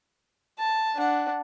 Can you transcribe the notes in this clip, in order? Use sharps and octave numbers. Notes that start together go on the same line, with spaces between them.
A5
D4 F#5